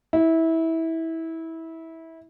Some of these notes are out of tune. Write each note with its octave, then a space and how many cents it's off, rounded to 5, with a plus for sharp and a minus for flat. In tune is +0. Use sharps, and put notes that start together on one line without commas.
E4 -20